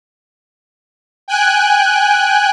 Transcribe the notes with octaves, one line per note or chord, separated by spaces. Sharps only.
G5 G#5 F#6